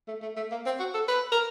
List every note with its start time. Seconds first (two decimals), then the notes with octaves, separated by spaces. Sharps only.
0.08 A3
0.22 A3
0.37 A3
0.51 A#3
0.66 C4
0.79 F#4
0.94 A4
1.09 B4
1.32 A#4